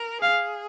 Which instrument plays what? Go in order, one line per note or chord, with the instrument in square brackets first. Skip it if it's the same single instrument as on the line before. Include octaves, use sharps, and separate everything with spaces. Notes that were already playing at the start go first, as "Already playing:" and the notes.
Already playing: [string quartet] A#4
[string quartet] G#4 [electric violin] F5